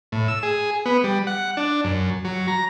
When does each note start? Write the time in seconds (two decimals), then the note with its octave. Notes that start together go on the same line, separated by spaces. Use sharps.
0.12 A2
0.28 E6
0.43 G#4
0.86 B3
1.04 G3
1.27 F#5
1.57 D4
1.84 F#2
2.25 F#3
2.48 A#5